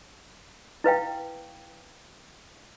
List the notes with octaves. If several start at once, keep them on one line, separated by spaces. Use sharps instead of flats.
E4 B4 F5 G5